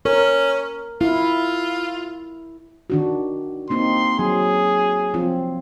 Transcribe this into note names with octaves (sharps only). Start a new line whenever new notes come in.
C#4 A#4
E4 F4
D#3 D4 F#4
A#3 C4 D#4 C6
F#3 G#4
F3 C4 F4